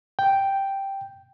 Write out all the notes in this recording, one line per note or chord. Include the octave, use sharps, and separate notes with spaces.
G5